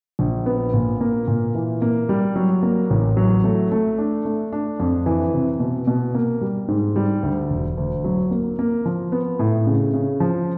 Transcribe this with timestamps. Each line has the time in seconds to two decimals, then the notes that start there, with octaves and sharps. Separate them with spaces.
0.19 A#1
0.46 B3
0.74 A#2
1.01 A#3
1.28 A#2
1.55 E3
1.82 A#3
2.09 G3
2.36 F#3
2.63 A#3
2.90 A1
3.17 F#3
3.44 A3
3.72 A3
3.98 D4
4.25 A3
4.53 D4
4.80 F2
5.06 E3
5.33 C3
5.60 B2
5.87 B2
6.15 A#3
6.41 G3
6.68 G#2
6.96 G3
7.23 D2
7.50 E1
7.77 D2
8.04 F#3
8.31 A#3
8.59 A#3
8.85 F3
9.12 B3
9.39 A2
9.66 C#3
9.94 C#3
10.20 F3